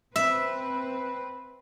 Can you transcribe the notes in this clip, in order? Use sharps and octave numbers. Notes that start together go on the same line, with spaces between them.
C4 B4 E5